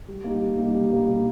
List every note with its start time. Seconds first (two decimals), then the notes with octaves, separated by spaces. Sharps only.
0.08 G3
0.24 A#3 D#4 G4
0.42 G3
0.58 A#3 D#4 G4
0.75 G3
0.91 A#3 D#4 G4
1.09 G3